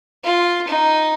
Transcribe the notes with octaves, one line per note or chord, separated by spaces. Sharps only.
F4
D#4